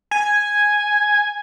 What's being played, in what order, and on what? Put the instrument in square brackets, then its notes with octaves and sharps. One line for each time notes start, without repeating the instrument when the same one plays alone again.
[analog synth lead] G#5